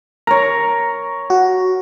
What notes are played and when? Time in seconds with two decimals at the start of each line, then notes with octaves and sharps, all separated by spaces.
0.27 A#4 C#5 A#5
1.30 F#4